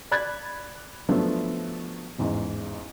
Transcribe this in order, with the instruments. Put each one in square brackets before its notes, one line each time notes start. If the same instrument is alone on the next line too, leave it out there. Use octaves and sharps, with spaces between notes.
[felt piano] D5 B5 F#6 G#6 A6
F3 F#3 A3 B3 D4
A1 E2 G#2